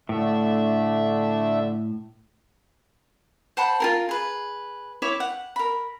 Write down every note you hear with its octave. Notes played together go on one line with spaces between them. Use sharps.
A2 D3 A3 E5
C5 F#5 A5 B5
F4 G#4 A#4
G#4 B4
E4 C#5 E5 D6
F#5
A#4 B5